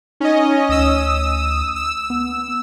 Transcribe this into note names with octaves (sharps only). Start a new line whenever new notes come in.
C#4 D#4 D#5
D2 D#6 E6
E6
B3